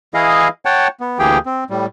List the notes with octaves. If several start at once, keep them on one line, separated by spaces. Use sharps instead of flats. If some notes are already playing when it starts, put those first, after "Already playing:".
E3 E4 G#4 D#5 F5
C#5 F#5 G5 A5
B3
D2 E3 A#3 G4 G#4 G5
C4
A2 G3